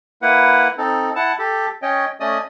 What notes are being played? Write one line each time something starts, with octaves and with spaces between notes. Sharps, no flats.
A#3 E4 B4 F#5
C4 D#4 A4
E4 F#5 A5
G4 A4
C#4 C#5 D#5 G5
A3 C#4 D5 D#5 D#6